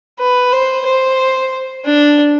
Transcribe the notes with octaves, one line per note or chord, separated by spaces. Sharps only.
B4
C5
C5
D4